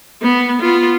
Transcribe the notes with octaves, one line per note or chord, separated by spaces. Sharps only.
B3
B3 F4